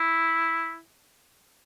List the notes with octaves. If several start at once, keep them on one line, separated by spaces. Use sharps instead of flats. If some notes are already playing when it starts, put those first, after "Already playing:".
Already playing: E4